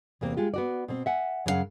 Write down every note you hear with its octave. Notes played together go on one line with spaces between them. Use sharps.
E2 C3 A#3 C4
G#3 F4 G4
B3 F#4 D5
B2 C4
E5 F#5 G#5
F#2 C#3 D4 F5 F#5